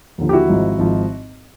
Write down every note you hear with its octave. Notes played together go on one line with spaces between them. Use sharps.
D#2 D3 F3
G4
E4 F#4
G#1 G#2 F3
G#1 G#2 F3